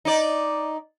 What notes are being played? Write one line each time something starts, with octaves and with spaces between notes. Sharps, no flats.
D#4 D5